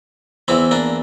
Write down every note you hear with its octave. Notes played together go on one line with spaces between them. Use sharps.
E2 E3 C4 E4
A#3 D4